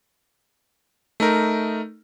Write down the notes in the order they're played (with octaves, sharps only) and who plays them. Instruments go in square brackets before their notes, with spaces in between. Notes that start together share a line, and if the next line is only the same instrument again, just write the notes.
[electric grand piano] A3 D#4 A#4